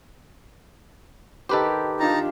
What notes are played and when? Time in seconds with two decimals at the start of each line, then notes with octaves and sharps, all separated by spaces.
1.49 D#3 G4 A4 B4 C5
1.99 D4 D#4 F4 A5 A#5